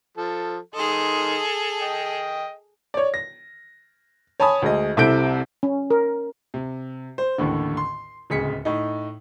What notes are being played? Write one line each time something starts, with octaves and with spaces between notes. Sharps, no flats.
F3 A4
D#3 G#4 A4 D#5 C6
D#5 G5
C#5 D5
A#6
C#5 G#5 A5 B5 D#6
D2 G#3 D#5
C2 C3 E4 A4 G6 D7
C#4
A#4
C3
C5
A1 D#2 A2 D3
C6
D1 C#2 G#4 B6 C#7
A2 D#4